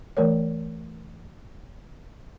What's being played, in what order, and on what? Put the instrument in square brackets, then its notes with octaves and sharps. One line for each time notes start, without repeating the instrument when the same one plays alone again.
[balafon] E3 A3 A#4 C#5